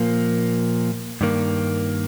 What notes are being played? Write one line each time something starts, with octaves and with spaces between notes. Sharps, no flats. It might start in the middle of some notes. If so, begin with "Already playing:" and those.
Already playing: A#2 F3 A#3
G2 D#3 A#3